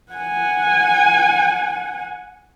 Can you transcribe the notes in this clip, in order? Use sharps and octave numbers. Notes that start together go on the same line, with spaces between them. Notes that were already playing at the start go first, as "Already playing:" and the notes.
F#5 G#5